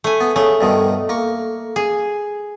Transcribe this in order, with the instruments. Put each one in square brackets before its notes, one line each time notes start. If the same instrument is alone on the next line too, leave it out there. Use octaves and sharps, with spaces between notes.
[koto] A3 G#5
[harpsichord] B3
[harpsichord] C#3 [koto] A3
[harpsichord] G2 B2 D#3
A#3 C#6
[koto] G#4